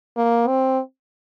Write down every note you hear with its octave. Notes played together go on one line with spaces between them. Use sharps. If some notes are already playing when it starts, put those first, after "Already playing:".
A#3
C4